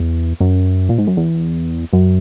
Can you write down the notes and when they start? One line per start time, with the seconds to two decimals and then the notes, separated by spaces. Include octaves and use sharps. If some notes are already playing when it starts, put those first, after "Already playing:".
Already playing: E2
0.40 F#2
0.89 A#2
0.98 G#2
1.07 F#2
1.17 E2
1.93 F#2